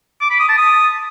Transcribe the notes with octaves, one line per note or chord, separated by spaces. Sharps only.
D6
B5
D#6
A5
D#6